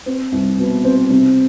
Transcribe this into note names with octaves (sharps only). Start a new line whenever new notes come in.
C4
C2
B2
C4
C3